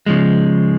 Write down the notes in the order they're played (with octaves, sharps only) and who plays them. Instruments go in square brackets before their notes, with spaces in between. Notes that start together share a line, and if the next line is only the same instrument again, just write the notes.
[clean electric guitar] C#3 F3 G#3